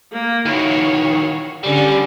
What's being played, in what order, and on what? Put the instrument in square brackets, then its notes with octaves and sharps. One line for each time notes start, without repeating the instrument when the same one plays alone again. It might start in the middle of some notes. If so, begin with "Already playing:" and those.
[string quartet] A#3
[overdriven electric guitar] D#3 E3 [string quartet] F#4 C#5 F5
[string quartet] D3 C#4 G#4 [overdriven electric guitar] G3